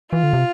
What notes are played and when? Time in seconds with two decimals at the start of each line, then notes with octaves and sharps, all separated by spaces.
0.12 E3 F4
0.23 D3
0.33 C3